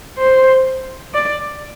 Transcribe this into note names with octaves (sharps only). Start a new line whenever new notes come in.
C5
D5